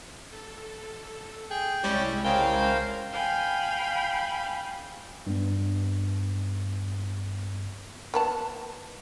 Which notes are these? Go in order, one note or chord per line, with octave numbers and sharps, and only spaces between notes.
A4
G#4 G5
C2 G3 G#3 C#4 E4
C#3 A#4 C5 F5 G5
F5 G5 G#5 B5
G2 B3
A#3 B3 A5